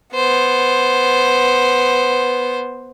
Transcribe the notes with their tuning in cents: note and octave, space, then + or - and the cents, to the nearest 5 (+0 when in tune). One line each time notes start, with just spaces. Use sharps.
B3 +0 C5 +0